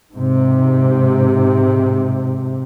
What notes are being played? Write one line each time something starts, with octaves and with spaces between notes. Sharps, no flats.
G#2 C3